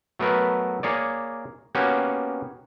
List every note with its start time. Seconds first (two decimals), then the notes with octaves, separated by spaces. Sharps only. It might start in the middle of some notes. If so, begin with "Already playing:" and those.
0.19 F#3 A3 B3 A#4 B4
0.83 A#3 G#4 C#5 D5
1.75 A#3 B3 C#4 F#4 G4 C#5